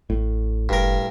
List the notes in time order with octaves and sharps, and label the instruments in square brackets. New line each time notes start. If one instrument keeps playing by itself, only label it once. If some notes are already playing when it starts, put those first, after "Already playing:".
[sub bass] A1 [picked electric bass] A2
[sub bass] F#1 [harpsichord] G2 A#4